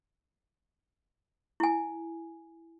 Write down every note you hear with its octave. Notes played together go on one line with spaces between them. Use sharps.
E4 G#5